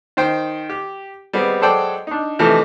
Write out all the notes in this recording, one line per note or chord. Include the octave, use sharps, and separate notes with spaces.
D#3 C5 G5
G4
G3 G#3 B3 C4
F#3 G#3 A4 C5 D5 G5
D4 D#4
C3 E3 F3 A3 D#4 A4